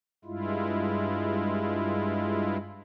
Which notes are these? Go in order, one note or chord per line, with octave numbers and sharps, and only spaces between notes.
G2 G#3 E4 F4